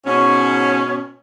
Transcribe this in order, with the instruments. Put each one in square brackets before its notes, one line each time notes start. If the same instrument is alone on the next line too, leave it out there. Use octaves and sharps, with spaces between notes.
[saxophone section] G#2 B2 C#4